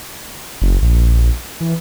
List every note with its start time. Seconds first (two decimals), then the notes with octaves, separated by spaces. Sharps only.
0.62 F#1
0.82 A#1
1.61 E3